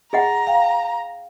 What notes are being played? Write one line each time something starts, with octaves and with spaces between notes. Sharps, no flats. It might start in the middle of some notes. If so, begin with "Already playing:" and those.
G#4 D#5 F#5 A#5
F5 G5